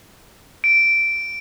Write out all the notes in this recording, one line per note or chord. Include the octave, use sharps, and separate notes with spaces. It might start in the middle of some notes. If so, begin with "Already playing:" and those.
D7